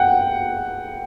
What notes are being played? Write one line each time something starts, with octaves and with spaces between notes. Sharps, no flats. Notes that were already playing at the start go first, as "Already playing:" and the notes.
Already playing: F#5 G5